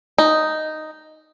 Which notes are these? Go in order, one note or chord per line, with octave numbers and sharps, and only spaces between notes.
D#4